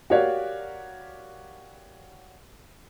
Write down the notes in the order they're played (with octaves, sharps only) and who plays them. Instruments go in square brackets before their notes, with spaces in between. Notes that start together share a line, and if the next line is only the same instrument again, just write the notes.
[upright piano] F#4 G4 A#4 C#5 D5 F5